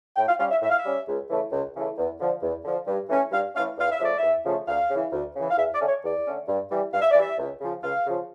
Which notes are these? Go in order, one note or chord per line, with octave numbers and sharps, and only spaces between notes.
A2 G5
F5
G3 C#4 F5
E5
A2 E5
F5
E5
G3 C#4
C#2
C#3 E3 A3
C#2
C#3 E3 A3
E2
D3 F3
E2
D3 F3
G2
E3 A3 C#4
G2 F5
E3 A3 C#4 F5
E2 F5
E5
C#3 F3 A3 D5
E5
E2
C#3 F3 A3
D2 F5
C#3 E3
D2
C#3 E3
F5
E2 E5
D5
D3 A3 C#4
C#5
E2 D5
D3 A3 C#4
G2
E3 G3
G2 F5
E5
D5
E3 G3 E5
C#2
C#3 F3
C#2 F5
C#3 F3